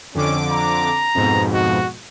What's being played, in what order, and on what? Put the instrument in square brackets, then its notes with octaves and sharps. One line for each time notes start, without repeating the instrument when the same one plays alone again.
[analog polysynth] F2 D3 D6 [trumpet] C#4
[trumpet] A#5
[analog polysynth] F2 G#2 B2
[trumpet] F#4